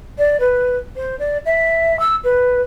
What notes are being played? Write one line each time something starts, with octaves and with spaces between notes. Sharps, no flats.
D5
B4
C5
D5
E5
E6
B4